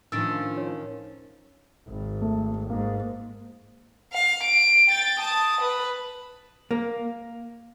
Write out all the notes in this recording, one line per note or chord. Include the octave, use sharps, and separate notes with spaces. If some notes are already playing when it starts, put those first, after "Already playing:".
A2 D#3 F3 C#4 D4 E6 A6 D7
C#5
G#1
A3
G#2 A#3
F5
D7
G5 A6
A5 D#6
B4
A#3